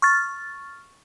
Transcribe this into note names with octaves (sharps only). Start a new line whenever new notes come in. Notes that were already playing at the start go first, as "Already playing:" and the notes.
C#6 F6 A6